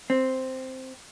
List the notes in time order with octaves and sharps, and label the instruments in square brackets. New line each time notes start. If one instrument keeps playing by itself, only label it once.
[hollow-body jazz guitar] C4